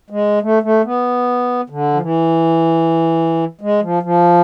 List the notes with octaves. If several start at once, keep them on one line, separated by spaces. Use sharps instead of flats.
G#3
A3
A3
B3
D3
F3
E3
G#3
F3
F3